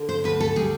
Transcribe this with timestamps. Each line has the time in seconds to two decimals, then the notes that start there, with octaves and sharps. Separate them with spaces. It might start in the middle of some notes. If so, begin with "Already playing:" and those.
Already playing: D3
0.09 C5
0.24 D2 B4
0.40 A4
0.56 G3 G#4